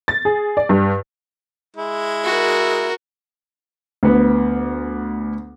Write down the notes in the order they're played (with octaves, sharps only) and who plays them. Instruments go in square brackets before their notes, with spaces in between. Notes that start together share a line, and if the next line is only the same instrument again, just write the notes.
[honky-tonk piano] A6
G#4
D5
G2
[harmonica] G#3 E4
[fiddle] F#4 A#4
[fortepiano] D2 B3